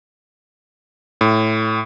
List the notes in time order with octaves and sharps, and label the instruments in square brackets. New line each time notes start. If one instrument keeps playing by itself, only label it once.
[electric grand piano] A2